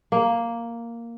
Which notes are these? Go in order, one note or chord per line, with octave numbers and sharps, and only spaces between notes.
A#3